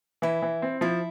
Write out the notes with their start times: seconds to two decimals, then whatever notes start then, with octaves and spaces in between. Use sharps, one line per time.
0.22 E3 E4
0.42 E3
0.62 C4
0.81 F3 E4